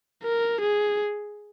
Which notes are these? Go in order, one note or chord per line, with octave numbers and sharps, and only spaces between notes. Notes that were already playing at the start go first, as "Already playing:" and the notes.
A#4
G#4